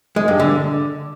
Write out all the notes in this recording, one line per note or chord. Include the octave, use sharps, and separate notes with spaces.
G#3
G2
D3